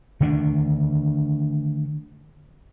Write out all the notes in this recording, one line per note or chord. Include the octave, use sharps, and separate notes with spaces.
D3 D#3 A3 D4